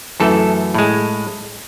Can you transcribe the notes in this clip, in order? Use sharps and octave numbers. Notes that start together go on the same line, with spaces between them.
F#2 E3 A3 A4
A2 G#3